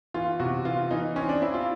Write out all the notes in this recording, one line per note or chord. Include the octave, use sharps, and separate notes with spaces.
E3 F4
C3 F#4
E3 F4
E3 D#4
C4 C#4
D4
C4 E4
F4